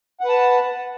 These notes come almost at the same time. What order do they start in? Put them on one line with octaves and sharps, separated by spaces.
F#5 B4 A5